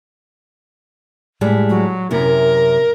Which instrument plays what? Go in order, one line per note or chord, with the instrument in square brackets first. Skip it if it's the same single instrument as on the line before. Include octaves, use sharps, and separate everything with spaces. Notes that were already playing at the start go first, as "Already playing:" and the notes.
[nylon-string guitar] A2 G3 G#3
[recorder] F#3
[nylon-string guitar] F#2 C3 E4 [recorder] A#4